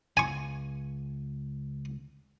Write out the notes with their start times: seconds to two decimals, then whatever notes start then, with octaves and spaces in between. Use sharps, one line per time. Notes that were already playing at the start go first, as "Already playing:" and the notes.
0.17 C#2 G#5 C#6